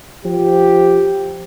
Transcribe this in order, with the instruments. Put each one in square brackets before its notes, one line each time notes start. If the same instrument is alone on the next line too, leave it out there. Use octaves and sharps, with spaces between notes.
[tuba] F3 [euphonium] G4